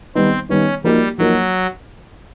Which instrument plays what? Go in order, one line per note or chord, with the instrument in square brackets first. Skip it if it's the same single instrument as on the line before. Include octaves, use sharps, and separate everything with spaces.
[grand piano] D#3 G3 B3 D#4 [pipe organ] C4
[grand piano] D#3 G3 B3 D#4 [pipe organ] C#4
[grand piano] F3 A#3 D#4 F#4 A#4 [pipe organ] G3
[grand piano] F3 A#3 D#4 F#4 A#4 [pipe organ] F#3